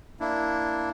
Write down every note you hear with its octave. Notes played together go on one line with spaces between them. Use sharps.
A#3 D4 E4